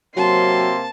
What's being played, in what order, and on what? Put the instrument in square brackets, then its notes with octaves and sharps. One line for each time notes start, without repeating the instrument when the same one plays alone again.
[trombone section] C3 A#3 C4 [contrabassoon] F#3 [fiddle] A5 [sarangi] C6